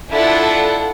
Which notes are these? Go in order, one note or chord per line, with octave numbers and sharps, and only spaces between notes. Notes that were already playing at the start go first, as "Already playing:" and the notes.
D4 E4 F4 A4 F#5